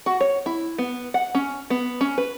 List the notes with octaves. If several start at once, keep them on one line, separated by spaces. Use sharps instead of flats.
F#4
C#5
E4
B3
F#5
C#4
B3
C#4
B4